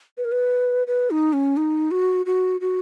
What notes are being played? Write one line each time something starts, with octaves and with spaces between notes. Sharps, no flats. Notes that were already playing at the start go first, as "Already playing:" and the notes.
B4
A#4
B4
B4
D#4
C#4
D#4
F#4
F#4
F#4